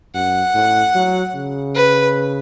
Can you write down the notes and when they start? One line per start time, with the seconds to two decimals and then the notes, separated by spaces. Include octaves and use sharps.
0.14 F#2 F#5
0.54 A2
0.95 F#3
1.35 C#3
1.75 B4